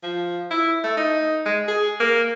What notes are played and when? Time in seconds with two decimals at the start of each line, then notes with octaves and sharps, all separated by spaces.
0.03 F3
0.51 E4
0.84 A3
0.97 D#4
1.45 G#3
1.68 G#4
2.00 A#3